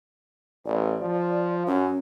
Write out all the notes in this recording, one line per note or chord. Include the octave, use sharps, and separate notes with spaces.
A1 D5
F3
F#2 C#4